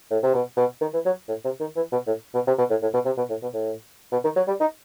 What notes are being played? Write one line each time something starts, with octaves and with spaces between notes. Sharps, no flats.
A2
C3
B2
B2
D#3
E3
F#3
A2
C3
D#3
E3
B2
A2
B2
C3
B2
A2
A2
B2
C3
B2
A2
B2
A2
B2
D#3
F#3
G3
D#4